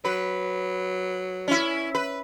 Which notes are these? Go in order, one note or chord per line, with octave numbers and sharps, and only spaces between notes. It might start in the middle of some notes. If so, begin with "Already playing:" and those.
F#3 B4
C#4 E4
B4